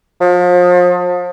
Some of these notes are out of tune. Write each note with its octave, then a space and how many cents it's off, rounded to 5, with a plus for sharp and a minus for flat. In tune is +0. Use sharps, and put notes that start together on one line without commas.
F3 +35